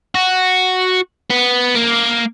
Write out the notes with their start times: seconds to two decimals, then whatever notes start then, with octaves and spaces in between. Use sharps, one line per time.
0.15 F#4
1.30 B3
1.75 A#3